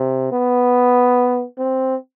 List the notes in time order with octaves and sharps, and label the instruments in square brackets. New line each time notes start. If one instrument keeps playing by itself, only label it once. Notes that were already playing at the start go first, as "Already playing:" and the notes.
Already playing: [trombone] C3
B3
C4